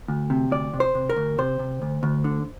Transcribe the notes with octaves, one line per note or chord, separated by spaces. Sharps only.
D2
C3
D2 D5
C3
C5
C3
A#4
D2
C3 C5
C3
D2
D2
D3